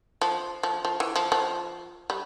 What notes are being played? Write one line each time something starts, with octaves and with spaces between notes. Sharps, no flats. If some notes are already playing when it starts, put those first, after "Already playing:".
F3
F3
F3
E3
F3
F3
G3